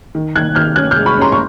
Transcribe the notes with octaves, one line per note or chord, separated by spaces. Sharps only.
D#3
D#3 F#6 G#6
D#3 F6 G6
C#4 F#6 G#6
F6 G6
G#3
B5 C#6
C#4 A#5 C6
C#6